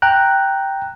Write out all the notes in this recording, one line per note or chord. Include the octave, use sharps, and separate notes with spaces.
G5 A#5 F#6